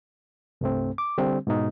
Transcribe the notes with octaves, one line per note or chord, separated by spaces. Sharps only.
C2 G2 A3 C4
D6
D3 G3 C4
G#2 B2 D#4